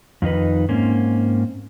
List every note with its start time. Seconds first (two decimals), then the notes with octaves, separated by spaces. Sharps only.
0.22 F2 D#3 D#4 B4
0.68 G#2 A#3 C4 C#4